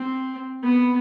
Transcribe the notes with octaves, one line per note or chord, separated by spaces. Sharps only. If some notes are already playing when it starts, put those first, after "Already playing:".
Already playing: C4
B3